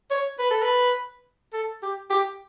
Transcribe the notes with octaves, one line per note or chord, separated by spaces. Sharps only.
C#5
B4
A4
B4
A4
G4
G4